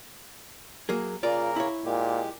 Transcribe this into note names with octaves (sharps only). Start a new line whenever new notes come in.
F#3 A#3 G#4
C#3 A#3 F4 A#4 D5
E4 C#5
A#2 G#3 G4